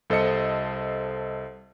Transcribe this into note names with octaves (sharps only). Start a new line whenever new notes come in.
C2 A4 C5 D#5 C#7